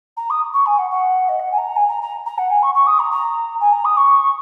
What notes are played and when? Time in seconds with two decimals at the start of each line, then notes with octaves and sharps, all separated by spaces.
0.17 A#5
0.30 D#6
0.53 C#6
0.66 G#5
0.78 F#5
0.90 F#5
1.28 D#5
1.39 F#5
1.51 G#5
1.58 A#5
1.76 G#5
1.88 A#5
2.01 A#5
2.26 A#5
2.38 F#5
2.50 G#5
2.62 C#6
2.74 C#6
2.86 D#6
2.99 A#5
3.11 A#5
3.60 G#5
3.72 A#5
3.84 D#6
3.97 C#6